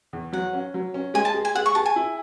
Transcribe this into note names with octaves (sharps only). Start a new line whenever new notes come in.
E2
F#3 F#5
C#4
F#3
C#4
G#3 G#5
A5
G#4
G#5
G#4 F#5
C#6
G#4 A5
G#5
E4